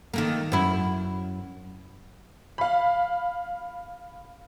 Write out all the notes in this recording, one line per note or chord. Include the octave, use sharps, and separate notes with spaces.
D#3 A3 A#3
F#2 E4
F5 B5